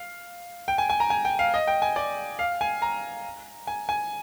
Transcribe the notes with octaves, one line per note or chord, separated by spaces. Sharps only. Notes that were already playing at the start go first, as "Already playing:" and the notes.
Already playing: F5
G5
G#5
G#5
A#5
G#5
G5
F5
D#5
G5
G#5
D5
F5
G#5
A#5
G#5
G#5